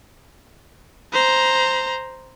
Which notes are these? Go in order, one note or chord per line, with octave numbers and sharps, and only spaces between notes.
C5 A#5